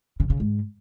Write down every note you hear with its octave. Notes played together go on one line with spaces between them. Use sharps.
C#3
C#3
G#2